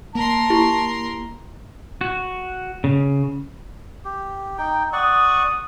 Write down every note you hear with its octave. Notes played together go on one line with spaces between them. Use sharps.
A#3 A#4 A5 C6
E4 G4
F#4
C#3
G4
D#4 G5
D5 F#5 C#6 D#6